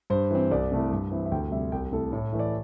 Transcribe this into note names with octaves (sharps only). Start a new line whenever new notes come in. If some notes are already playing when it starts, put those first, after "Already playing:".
G2 C5
E3 C4
C2 D5
C3 A3 E4
G2
E3 C4 E4
E5
D2 G5
C3 G3 E5
C2 G5
C3 A3 E4 A4
A2 A4
E3 A3
D5